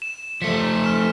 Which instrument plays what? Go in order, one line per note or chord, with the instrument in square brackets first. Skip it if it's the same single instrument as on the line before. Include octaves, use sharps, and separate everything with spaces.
[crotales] E7
[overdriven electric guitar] F3 A3 [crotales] B6 C#7 E7
[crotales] F6 E7